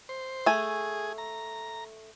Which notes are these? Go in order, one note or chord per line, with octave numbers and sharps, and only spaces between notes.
C5
A3 G#4 G#5
A#5